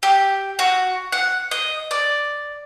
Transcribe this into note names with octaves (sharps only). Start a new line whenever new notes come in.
G4
F#4
F#5
D#5
D5